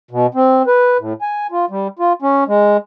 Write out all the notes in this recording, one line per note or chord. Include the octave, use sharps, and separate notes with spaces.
B2
C4
B4
A2
G#5
F4
G3
F4
C#4
G#3